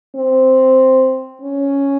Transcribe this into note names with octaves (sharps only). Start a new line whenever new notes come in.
C4
C#4